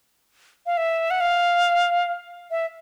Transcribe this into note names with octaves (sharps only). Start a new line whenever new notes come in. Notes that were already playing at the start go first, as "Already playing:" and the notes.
F5
E5
F#5
F5
E5